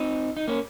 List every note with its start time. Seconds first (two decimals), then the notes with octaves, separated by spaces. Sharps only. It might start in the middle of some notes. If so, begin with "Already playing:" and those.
Already playing: C4 D#4
0.37 D#4
0.48 A#3 C#4